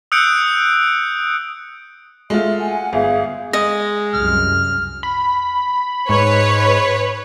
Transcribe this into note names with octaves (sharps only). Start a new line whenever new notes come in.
D#6 E6 F#6 G6 C#7 D7
G#3 A3 F4 E5
F#5 G#5
G1 G#4 E5 F5
G#3 D#5
C2 F#2 F6
B5
G#2 B4 C#5